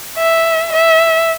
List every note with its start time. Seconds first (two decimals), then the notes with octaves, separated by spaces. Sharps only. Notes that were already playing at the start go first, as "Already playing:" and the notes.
0.18 E5
0.72 E5